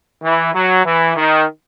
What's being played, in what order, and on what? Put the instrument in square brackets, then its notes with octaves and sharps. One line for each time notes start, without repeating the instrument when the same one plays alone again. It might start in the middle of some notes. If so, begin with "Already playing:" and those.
[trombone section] E3
F#3
E3
D#3